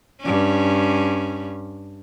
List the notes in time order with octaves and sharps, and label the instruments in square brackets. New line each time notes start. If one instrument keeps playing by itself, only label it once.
[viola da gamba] G2 C#4